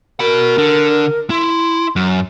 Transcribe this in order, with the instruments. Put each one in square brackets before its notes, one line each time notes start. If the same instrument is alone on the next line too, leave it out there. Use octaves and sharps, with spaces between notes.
[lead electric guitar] F#4 B5 [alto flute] A#4
[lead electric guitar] D3
[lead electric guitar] E4 [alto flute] C6
[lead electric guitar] F#2